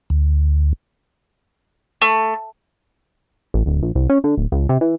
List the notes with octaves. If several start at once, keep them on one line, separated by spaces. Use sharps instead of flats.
D2
A3
A1
D1
A#1
C2
C#4
D3
D1
C#2
C3
E3